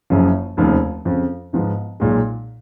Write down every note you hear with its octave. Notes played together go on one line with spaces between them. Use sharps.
F#1 F#2 C#3 F3
F1 D#2 C#3 F3
F2 C#3 F3
G#2 F3 B3 D#4
B1 A#2 G#3